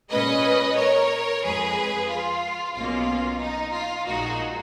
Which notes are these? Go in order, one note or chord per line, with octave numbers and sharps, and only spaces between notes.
A#2 G#3 C#4 B4 D#5
A#4 C#5
F2 F3 G#3 G#4 B4
F4
B1 B2 A#3 C#4 F4
D#4
F4
A#1 A#2 G#3 D#4 F#4